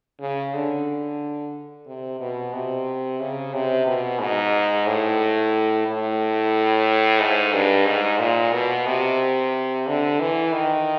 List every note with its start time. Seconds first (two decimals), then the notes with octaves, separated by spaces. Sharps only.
0.21 C#3
0.54 D3
1.87 C3
2.20 B2
2.53 C3
3.20 C#3
3.54 C3
3.87 B2
4.20 G#2
4.87 A2
5.87 A2
7.20 G#2
7.54 G2
7.86 G#2
8.19 A#2
8.53 B2
8.86 C3
9.87 D3
10.20 E3
10.52 D#3